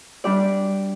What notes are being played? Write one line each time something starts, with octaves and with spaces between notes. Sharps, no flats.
G3 D4 G4 D5